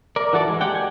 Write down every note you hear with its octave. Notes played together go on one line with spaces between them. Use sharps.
A#4 D5
E3 F#4 A4 D5
G#3
G4 D5 F#5 G5
G#5